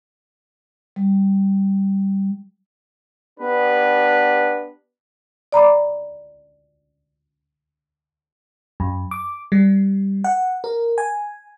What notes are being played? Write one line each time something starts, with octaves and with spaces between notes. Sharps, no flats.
G3
B3 D4 G4 B4
D5 A#5 B5 D6
F#2
D6
G3
F#5
A#4
G#5